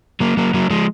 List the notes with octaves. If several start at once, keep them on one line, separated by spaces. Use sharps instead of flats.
F#3 A#3
F#3 A#3
F#3 A#3
F3 G#3